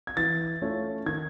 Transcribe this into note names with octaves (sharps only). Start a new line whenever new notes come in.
G#6
E3 A6
A3 C#4 F4
D#3 G#6